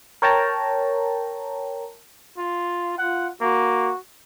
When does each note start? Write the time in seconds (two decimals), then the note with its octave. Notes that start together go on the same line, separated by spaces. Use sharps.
0.22 A#4 C#5 G5 A5 A#5
2.38 F4
2.98 F4 F#5
3.41 A#3 F#4